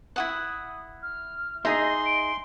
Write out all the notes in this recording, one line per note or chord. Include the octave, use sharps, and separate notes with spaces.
E4 F#4 F#5 D#6
F6
D#4 G#4 D#5 E5 C6 A#6
D7